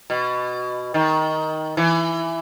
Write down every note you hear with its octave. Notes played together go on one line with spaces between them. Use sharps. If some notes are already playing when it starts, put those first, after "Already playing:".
B2
D#3
E3